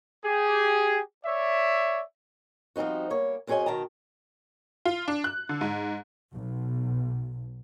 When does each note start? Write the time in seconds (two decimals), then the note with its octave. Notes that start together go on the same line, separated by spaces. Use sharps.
0.23 G4 G#4
1.25 C#5 D5 E5
2.76 F3 G3 C4 D#4 F#4
3.10 G3 A#3 C#5
3.47 F#2 C4 G#4 C#5 D#5 G#5
3.66 B2 D#3 G5 A5 A#5
4.85 F4
5.08 D4
5.24 F#6
5.49 D3
5.61 G#2
6.35 B1